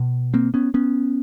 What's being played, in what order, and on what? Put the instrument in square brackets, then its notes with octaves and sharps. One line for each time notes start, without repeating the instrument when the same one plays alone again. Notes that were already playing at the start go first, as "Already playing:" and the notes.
Already playing: [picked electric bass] B2
A#3 C4
B3 C#4
B3 C#4